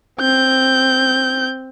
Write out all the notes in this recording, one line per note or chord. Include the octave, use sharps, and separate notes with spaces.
C4 G6